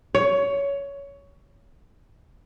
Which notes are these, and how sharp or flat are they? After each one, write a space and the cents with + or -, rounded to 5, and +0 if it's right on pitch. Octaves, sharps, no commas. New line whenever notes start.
C#5 +15